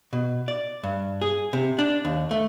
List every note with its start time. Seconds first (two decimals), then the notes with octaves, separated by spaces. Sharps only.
0.13 B2
0.48 D5
0.83 G2
1.21 G#4
1.53 C3
1.79 D4
2.05 D#2
2.31 A3